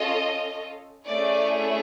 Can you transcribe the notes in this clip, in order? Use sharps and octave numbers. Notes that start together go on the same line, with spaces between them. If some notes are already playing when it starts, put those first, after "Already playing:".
Already playing: C#4 F4 A4 D#5
A3 C#4 E4 G#4 D5